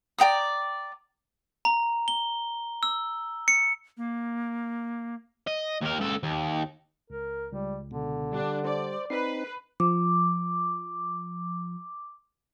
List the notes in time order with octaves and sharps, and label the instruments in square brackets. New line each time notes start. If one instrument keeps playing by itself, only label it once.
[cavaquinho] D5 G5 A#5 D#6
[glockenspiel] A#5
G7
E6
C#7
[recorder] A#3
[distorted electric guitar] D#5
D#2 A#4
C#2 A4
D#2
[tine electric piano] C#2 [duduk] A#4
[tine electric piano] C#2 [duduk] G3
[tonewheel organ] B2 [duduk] D3
[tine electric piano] G3 G4 [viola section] D4
[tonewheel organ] C5 [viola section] D5
[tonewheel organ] C4 D#4 [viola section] B4 [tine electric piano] C7
[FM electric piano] F3 [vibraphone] D6